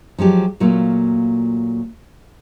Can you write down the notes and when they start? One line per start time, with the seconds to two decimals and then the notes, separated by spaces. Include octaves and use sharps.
0.18 F3 F#3 G#3 G4
0.60 A#2 F#3 A3 A#3 F4